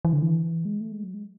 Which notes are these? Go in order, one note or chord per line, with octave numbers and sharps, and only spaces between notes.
E3
D3
E3
G#3
A3
G#3
F#3
G#3